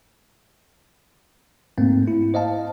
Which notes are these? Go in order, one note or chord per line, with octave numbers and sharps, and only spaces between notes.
G#2 A3 A#3 C4
E4
C5 D#5 F5 A5